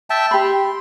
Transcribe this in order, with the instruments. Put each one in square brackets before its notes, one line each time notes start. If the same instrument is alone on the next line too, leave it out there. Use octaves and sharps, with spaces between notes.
[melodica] E5 G5 A5
[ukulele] G4 B5 [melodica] C6